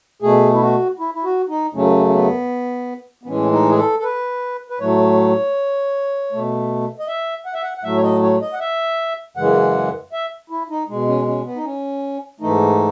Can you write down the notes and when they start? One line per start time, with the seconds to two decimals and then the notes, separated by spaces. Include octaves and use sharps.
0.22 B2 A3 G#4
0.54 E4
0.61 F#4
0.99 E4
1.14 E4
1.24 F#4
1.49 D#4
1.75 F#2 C#3 F#3 A3 C#4
2.09 C#4
2.14 B3
3.23 B3
3.27 A2 E3 G#3 C#4
3.52 D#4
3.70 G#4
3.78 A4
3.99 A4
4.03 B4
4.70 B4
4.80 A2 F#3 A3 C#5
6.32 B2 A3
6.99 D#5
7.08 E5
7.46 F#5
7.54 E5
7.63 F#5
7.78 F#5
7.83 A2 F#3 A3 E5
7.97 C#5
8.03 D#5
8.23 C#5
8.41 D#5
8.53 F#5
8.60 E5
9.37 F#2 C#3 E3 G#3 F#5
10.13 E5
10.50 E4
10.70 D#4
10.88 B2 G#3
11.08 C#4
11.27 C#4
11.45 B3
11.56 D#4
11.64 C#4
12.40 G#2 E3 A3 D#4